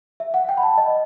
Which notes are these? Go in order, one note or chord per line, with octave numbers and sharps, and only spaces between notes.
E5
F#5
G5
B5
A5
D#5